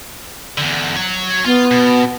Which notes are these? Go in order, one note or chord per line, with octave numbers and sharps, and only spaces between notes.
E2 D3
F#4 C#5
B3 F4
B2